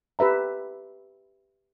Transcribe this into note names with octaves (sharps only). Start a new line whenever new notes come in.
G4 B4 E5 A#5